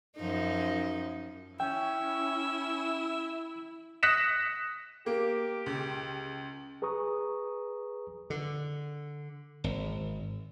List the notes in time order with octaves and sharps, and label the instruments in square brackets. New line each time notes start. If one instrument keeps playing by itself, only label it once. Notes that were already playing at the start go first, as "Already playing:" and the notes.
[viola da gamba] F#2 F3 D#4
[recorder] C#4 [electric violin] E4 [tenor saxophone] E5 [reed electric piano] G5
[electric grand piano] D#6 F#6 A#6 B6 C#7 E7
[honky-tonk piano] A#3 [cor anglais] G4
[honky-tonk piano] C#2
[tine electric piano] G#4 B4 A#5 C#6 D#6
[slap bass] D3
G#1